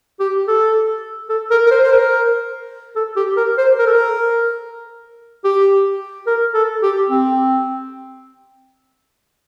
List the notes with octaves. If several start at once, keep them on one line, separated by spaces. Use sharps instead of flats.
G4
A4
A4
A#4
A#4
C5
C5
A#4
A4
G4
A#4
C5
A#4
A4
A#4
G4
A#4
A4
G4
C4